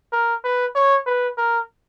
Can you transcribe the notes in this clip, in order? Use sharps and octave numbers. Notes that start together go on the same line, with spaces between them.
A#4
B4
C#5
B4
A#4